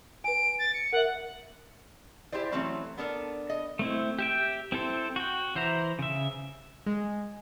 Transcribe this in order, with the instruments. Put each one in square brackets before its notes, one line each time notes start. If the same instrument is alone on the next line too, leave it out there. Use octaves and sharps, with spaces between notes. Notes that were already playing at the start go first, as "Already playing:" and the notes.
[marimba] B4 G#5 [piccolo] D7
[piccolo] A6
C#7
[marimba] A#4 E5 [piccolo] F#5
[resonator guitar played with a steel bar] E4 G4 G#4 C5 D5
E3 F#3 A3 C4 C#4
B3 D4 A4 A#4
D#5
[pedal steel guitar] A3 C4 E4
G4 E5 G5
C4 E4 A4 C5
F#4 G5
E3 C5 E5 A#5
C#3 E5
[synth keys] G#3